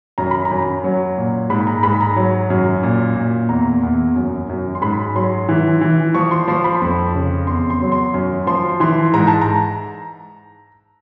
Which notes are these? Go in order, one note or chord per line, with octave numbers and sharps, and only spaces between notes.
F#2 A#5
B5
A#5
F#2
F#3
A#2
G#2 B5
A#5
G#2 B5
A#5
F#3
F#2
A#2
A#2
E2 A#5
E2
F#2
F#2
C6
G#2 B5
F#3 C6
E3
E3
F3 C#6
C6
F3 C6
B5
F2
C#3
E2 C6
C6
F#3
C6
F#2
F3 C6
E3 C6
G#2 A#5
A5
A#5